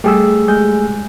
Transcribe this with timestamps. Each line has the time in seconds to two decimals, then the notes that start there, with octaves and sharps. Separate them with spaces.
0.04 G3 A3 G#4 E6
0.48 G#3 G6